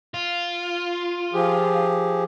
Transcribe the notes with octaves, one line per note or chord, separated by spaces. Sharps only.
F4
F3 G4 G#4